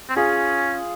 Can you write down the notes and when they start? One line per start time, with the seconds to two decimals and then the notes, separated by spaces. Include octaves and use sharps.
0.09 C4
0.16 C#4 F4 G#4